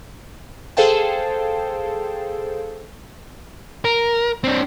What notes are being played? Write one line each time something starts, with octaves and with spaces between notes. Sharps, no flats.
G#4 A4 C5 F5 G5 A5
A#4
C4 D4